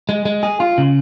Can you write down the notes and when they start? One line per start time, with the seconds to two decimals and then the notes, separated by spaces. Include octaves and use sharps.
0.09 G#3
0.25 G#3
0.43 G#4
0.60 F4
0.78 C#3